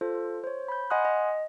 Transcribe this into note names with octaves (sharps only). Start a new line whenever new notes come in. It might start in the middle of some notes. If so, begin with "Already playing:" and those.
F4 A4 C5
C5 C#5
B5 G6
D#5 F#5 G#5 C6 D#6 F#6
D#5